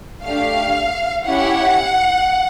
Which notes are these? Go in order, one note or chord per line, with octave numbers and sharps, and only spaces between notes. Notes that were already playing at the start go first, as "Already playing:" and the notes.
A3 D4 G4 F5
C#4 E4 G4 F#5